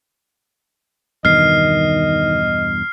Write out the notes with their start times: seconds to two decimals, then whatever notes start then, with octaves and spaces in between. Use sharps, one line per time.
1.25 E2 G2 B2 D#3 D#5 F6 C7